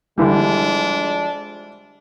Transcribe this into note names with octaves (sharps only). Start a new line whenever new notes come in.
D3 E3 F3 G3 G#3 D4